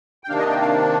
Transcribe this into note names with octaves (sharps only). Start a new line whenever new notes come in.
G5
C3 D#3 A#3 D4 F5
D#5
G5
F5